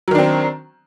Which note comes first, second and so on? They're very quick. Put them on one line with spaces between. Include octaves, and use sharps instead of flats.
F#3 D#3 D4 C4